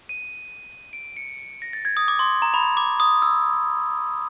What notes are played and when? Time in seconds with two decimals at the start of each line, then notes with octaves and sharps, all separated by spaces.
0.09 D#7
0.93 D7
1.17 C#7
1.62 A#6
1.73 A6
1.85 G#6
1.97 D#6
2.08 D6
2.19 C6
2.42 A#5
2.54 B5
2.77 D6
3.00 D#6
3.22 E6